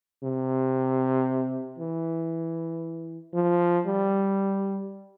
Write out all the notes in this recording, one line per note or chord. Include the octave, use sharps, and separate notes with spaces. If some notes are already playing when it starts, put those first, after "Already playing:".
C3
E3
F3
G3